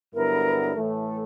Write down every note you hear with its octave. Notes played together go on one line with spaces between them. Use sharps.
G2 D3 F#3 B3 E4 A#4
A2 E3 A3
A4